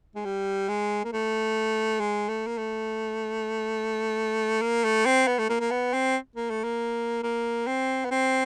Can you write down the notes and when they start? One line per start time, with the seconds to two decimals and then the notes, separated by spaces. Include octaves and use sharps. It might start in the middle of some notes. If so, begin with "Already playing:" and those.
0.15 G#3
0.25 G3
0.69 G#3
1.05 A#3
1.13 A3
2.00 G#3
2.28 A3
2.47 A#3
2.58 A3
4.62 A#3
4.84 A3
5.06 C4
5.28 B3
5.39 A3
5.49 A#3
5.60 A#3
5.71 B3
5.93 C4
6.36 A#3
6.50 A3
6.64 A#3
7.23 A#3
7.67 C4
8.05 B3
8.11 C4